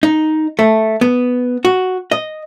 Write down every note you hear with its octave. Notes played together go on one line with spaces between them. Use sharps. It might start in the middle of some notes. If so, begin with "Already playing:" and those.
D#4
A3
B3
F#4
D#5